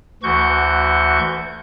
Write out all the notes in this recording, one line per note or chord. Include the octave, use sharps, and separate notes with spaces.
D2 E3 F#4 C#6 G6